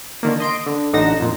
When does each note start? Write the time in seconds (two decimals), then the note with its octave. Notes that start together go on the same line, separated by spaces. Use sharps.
0.23 D3 D#3 A#3
0.40 D#5 C6 D7
0.66 D3
0.93 A1 D3 D#4 F#5 A#6 E7
1.20 F2 A#2